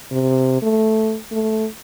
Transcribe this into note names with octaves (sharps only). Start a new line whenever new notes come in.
C3
A3
A3